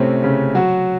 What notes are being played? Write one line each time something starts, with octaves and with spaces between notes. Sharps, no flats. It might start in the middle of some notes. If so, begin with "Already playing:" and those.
Already playing: A2 C3 A3 C4 C#4
C#3 C#4
F#3 F#4